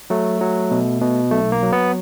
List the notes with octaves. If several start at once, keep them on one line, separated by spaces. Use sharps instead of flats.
F#3 A3
F#3
B2
B2
B1 A3
A#3
F#3
B3